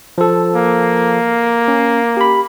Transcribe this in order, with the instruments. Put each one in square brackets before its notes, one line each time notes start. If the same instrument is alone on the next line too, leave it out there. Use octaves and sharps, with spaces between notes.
[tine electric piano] F3 A4
[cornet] A#3
[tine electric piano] C#4
G4 B5